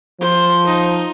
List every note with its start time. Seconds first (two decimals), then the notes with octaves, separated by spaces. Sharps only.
0.21 F3 C5
0.66 D#4